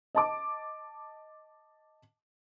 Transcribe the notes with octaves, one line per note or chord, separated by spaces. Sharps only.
D#5 A5 D6